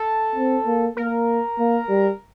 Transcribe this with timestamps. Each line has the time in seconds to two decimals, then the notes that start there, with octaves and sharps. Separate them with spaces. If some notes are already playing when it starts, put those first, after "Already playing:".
Already playing: A4
0.35 C4
0.66 A#3
0.97 A#3 A#4
1.59 A#3
1.89 G3